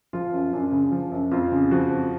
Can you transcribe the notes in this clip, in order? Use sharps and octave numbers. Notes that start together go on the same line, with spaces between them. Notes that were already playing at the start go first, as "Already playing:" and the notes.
F3 F4
F#2
F#2 D4
C#3
F3
F#2
F2 F4
C#3
F3 F#4
F2